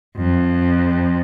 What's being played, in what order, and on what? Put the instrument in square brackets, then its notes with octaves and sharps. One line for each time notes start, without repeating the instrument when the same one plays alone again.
[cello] F2